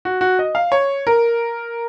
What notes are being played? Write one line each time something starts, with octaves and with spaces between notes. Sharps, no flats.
F#4
F#4
D#5
F5
C#5
A#4